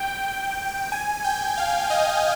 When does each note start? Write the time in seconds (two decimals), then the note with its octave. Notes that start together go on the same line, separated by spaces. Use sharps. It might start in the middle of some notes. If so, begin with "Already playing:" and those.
Already playing: G5
0.92 G#5
1.24 G5
1.57 F5
1.90 D#5